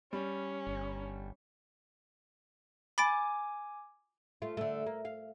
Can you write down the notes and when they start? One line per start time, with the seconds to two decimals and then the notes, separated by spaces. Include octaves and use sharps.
0.13 G3 C#4
0.67 G1
2.98 G#5 B5 D6 A6 D7
4.42 A3 F4
4.57 D3 A3
4.86 A#3
5.05 F5